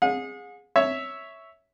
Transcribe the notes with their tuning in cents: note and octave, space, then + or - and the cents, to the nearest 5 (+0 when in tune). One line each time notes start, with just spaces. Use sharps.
G#4 -10 F#5 -45
C#5 +0 E5 -5